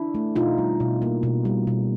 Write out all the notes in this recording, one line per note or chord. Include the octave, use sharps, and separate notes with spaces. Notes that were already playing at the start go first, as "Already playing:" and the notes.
Already playing: D4 E4
A3
B2 D#4 F4
G3
B2
A#3
B2
G3
B2